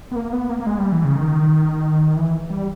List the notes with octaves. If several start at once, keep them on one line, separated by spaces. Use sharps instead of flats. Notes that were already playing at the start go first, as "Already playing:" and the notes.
B3
A#3
B3
A#3
A#3
G#3
G3
E3
C#3
D#3
E3
G3